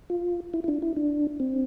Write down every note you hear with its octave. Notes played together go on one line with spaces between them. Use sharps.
F4
E4
E4
D4
E4
D4
C4